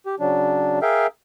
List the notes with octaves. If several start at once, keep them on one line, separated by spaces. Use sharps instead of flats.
G4
C#3 F#3 D4
G#4 A#4 E5 F5 G5